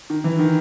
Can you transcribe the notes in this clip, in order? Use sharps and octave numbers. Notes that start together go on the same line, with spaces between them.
D#3
E3
D#3